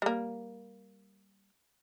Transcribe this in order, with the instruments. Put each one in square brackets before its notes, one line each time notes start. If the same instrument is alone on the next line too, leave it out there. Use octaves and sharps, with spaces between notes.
[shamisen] G3 A#3